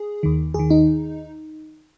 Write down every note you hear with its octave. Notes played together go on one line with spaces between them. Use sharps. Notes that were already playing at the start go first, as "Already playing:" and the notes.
Already playing: G#4
D#2 D#3
D#2 D#3 G#4
D#4